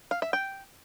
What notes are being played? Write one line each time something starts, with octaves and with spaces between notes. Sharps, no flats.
F5
E5
G5